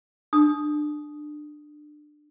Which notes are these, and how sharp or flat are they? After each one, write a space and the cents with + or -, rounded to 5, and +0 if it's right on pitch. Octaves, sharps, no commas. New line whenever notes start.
D4 +25 D#6 +0